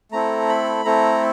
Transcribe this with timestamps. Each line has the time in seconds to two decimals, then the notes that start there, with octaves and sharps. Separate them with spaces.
0.12 A3 C4 E4 A4 A#5
0.49 B5
0.85 A3 C4 E4 A4 A#5